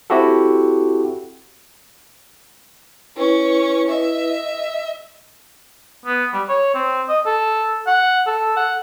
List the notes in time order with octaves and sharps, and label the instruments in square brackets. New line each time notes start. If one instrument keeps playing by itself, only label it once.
[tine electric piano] C4 E4 F#4 G4 A4
[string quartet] C#4 C#6 [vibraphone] E4 B4
[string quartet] D#5 E5
[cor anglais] B3
G3
C#5
C4
D#5
A4
F#5
A4
F#5